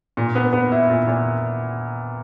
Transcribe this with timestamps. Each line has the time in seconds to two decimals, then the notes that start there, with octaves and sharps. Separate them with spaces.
0.17 A#2
0.35 B3
0.53 B3
0.72 E4
0.89 A#2
1.07 A#2